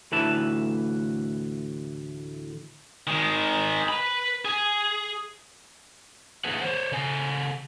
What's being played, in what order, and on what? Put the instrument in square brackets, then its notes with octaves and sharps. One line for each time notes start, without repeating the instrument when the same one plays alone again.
[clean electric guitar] D2 A2 E3 B4 E5 A5
[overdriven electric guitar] D#3 G#3
B4 B5
G#4
[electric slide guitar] D3 E3 A#3 G#4 B4 F#5
C5 C#5
C#3 A4 G#5